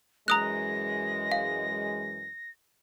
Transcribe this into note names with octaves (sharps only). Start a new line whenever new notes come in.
F#2 E3 G#3 A#5 D#6 F#6 A#6
F5